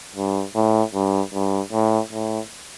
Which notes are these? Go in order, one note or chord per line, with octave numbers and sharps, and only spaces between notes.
G2
A2
G2
G2
A2
A2